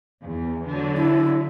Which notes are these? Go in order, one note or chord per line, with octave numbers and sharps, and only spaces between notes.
E2
D3 F#3
E4